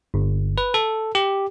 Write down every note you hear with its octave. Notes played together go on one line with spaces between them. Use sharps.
G1
B4
A4
G4